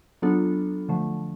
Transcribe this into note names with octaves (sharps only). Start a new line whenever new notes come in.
F#3 B3 D4 F4 A4
D3 F3 A3